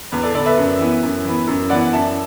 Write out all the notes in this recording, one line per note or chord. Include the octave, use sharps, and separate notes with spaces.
E2 B4
A4 D5
D3 B3 A4 D5
B4 E5
F#2
E3 B3
F#2
E3 B3
F#2
E3 B3 D5 F#5
F#2 E5 A5